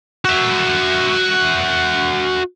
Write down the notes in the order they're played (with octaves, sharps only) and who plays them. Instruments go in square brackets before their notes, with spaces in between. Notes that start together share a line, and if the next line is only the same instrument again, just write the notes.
[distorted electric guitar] F#4 E5